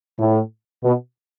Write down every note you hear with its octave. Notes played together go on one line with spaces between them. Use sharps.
A2
B2